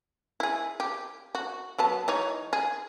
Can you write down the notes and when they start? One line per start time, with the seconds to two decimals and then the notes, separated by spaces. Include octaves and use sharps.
0.40 E4 G#4
0.80 G4
1.35 F#4
1.78 F#3 B3 A5
2.08 E3 D#4 C#5
2.53 G#4